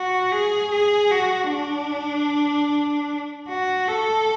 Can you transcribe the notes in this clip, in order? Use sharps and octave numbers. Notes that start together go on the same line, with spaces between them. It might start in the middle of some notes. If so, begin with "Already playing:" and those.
Already playing: F#4
G#4
G#4
F#4
D4
F#4
A4